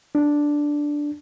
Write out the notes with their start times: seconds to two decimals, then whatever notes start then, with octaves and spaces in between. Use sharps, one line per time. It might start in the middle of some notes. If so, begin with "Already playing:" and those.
0.15 D4